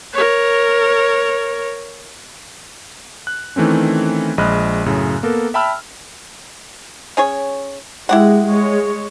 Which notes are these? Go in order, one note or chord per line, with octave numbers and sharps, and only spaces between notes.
A#4 C#5
F#6
D#3 E3 A3 C4 C#4
A#1 G#3 D#5 B5 F6 F#6
F#2 A2 C#3
A#3 B3 A4 A#4
E5 G5 A5 B5 E6 F6
C#4 G#4 C#5
G#3 E4 G4 F#5
G#3 C#5